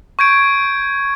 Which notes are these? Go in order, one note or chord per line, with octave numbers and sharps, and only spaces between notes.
C#6 G6 G#6 D7